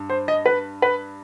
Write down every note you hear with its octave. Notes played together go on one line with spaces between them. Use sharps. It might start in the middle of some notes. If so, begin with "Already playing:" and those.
Already playing: G2
C5
D#5
B4
B4